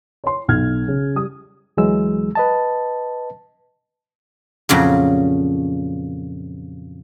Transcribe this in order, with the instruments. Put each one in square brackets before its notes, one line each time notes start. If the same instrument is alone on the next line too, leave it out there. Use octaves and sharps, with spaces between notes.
[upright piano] C#5 C6
B1 F6 G#6
C#3
G3 D#6
[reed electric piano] D2 E3 F#3 G#3 E6
B4 D#5 A5
[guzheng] F2 A#2 C#3 F#3